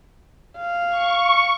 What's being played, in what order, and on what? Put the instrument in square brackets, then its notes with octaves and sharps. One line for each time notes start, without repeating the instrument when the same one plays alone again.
[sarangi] F5
[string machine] C#6